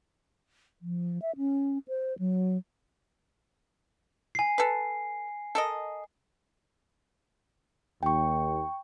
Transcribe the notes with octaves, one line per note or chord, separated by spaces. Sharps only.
F3
E5
C#4
C5
F#3
G#5 C7
A4 B4
A4 A#4 D#5
D#2 G5 C#6